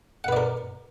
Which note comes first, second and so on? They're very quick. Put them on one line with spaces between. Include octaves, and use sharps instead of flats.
F#5 B4 D5 A#4